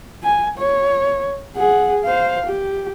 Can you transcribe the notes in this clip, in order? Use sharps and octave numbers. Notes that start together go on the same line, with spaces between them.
G#5
C#5
G#4 F#5
C5 F5
G4